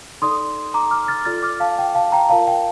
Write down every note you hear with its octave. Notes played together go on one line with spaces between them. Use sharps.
D#4 A4 D5 C6 D#6
A#5 D6
D6 F6
F6 A6
F4 A4 D5 F6 A6
D6 F6
F5 A5
G5
F5 A5
G5 A#5
F4 A#4 D5 F5 A5
G5